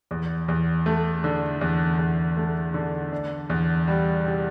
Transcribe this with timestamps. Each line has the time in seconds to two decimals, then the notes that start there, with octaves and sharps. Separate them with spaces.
0.11 E2
0.48 E2
0.86 A3
1.24 D3
1.61 E2
1.99 E2
2.37 A3
2.74 D3
3.12 D4
3.50 E2
3.88 G3
4.25 C3